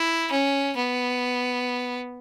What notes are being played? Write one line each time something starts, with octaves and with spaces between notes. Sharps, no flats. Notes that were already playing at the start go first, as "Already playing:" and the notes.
Already playing: E4
C#4
B3